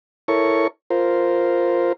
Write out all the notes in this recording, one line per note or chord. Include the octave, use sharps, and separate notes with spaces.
E4 A4 A#4 C#5 C#6
F4 A#4 C5